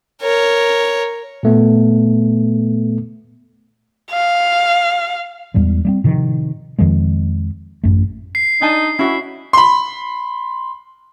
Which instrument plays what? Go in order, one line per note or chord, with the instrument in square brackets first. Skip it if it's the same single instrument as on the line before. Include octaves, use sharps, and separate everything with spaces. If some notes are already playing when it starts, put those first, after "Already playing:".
[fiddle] A#4 C#5
[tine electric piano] A#2 A3 B3
[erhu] F5
[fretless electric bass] E2 A2 G3 G#3
G3 A3 C4
A2 C3 D#3 F3
F2 D#3 F3 G#3
A1 F#2 A3
[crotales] C7
[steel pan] D4 G#5 A5 [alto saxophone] D#4
[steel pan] C#4 F#4 [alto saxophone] E4
[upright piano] B5 C6